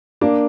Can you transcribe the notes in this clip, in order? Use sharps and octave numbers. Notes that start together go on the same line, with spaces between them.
A#3 D4